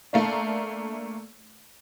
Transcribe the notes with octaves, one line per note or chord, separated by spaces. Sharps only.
A3 A#3 D4